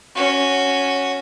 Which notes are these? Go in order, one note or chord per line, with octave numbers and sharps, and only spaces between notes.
C#4 F#4